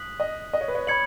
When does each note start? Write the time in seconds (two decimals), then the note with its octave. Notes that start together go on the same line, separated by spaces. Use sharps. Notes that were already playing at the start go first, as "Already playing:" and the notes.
Already playing: D#6 F#6 B6 F#7
0.20 D#5
0.53 D#5
0.61 C#5
0.68 B4
0.75 C#5
0.87 C#5 B5 G#6 C#7 F#7